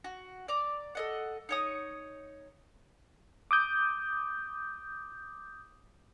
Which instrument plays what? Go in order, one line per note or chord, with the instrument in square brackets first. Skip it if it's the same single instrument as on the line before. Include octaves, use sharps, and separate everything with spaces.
[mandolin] F#4
D5 A#5 D6
A4 D#5 F#5
D#4 C#5 D#6
[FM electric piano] D6 D#6 G6